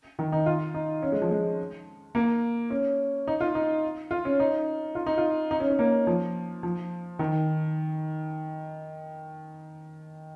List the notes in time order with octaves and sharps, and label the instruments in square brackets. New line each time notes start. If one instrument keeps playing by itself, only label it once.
[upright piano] D#3
D#4
F4
D#4
C#4
G#3
F3
G#3
A#3
C#4
D#4
F4
D#4
F4
C#4
D#4
F4
D#4
F4
D#4
C#4
C#4
A#3
F3
F3
D#3